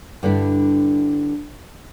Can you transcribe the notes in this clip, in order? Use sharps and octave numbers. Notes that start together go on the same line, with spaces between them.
G2 D3 D4 E4